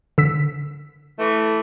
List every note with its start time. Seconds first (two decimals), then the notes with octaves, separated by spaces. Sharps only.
0.18 D3 E6 B6
1.18 E3 A3